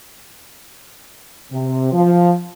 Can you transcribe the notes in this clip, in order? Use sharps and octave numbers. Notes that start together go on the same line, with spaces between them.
C3
F3